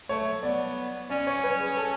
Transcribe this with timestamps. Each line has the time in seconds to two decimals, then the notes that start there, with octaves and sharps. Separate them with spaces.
0.09 A3 C#5
0.43 B3 D5
1.10 C#4 D5
1.27 C#5
1.44 B4
1.60 G#4
1.77 A4